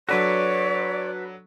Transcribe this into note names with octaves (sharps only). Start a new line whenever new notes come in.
F#3 D4 F#4 A4 B4 C#5 D5